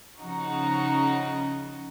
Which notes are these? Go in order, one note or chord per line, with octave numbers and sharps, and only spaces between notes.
C#3 F3 D#4 F#4